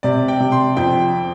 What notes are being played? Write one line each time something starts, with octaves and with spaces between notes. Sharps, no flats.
C3 D5
G5
C3
C6
F2 G5